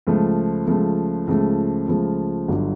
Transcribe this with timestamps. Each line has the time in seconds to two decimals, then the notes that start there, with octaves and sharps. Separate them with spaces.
0.07 C#2 C#3 F3 A3
0.67 C#2 C#3 F3 A3
1.27 C#2 C#3 F3 A3
1.88 C#2 C#3 F3 A3
2.48 G1 G2 D3 F#3